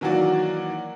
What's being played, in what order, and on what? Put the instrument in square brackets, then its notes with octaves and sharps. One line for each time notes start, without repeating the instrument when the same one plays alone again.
[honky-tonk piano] D#3 E3 F#3 A#3 F#4 D5